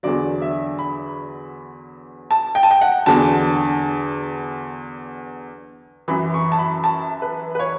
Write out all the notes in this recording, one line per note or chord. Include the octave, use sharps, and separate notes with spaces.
E2 D3 F#3 D5
E5
B5
A5
G5
A5
G5
F#5
E2 D3 F#3 A5
F#2 E3 B5
C#6
A5
B5
A5
B4
B4
C#5